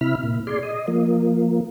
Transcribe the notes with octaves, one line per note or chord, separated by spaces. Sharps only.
C3 E4 B5 F6
A#2
G#4 D5 C6
D#5
F3 A#3